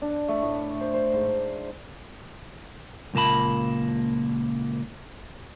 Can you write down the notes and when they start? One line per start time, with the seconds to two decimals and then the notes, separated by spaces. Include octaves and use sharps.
0.02 D4
0.28 A3
0.42 A2
0.81 C5
0.94 C5
1.13 G#2
3.14 C#2 A#2 A#3 A5 B5